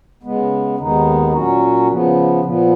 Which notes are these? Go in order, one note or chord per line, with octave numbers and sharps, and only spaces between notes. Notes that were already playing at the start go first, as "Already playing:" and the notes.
C#3 G#3 B3
D#2 D#3 G#3 B3 D#4
A#2 F#3 C#4 F#4
C#3 F3 B3
A#2 F3 B3